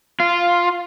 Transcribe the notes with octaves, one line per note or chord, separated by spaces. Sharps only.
F4